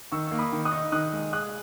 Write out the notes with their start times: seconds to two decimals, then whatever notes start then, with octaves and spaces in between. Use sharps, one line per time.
0.12 D#3 C#6 E6
0.27 A#3 E6
0.38 B5 D#6
0.53 D#3
0.65 D#6 F#6
0.72 D#4
0.92 D#3 D#6 F#6
1.13 G#3
1.33 G#4 D#6 F#6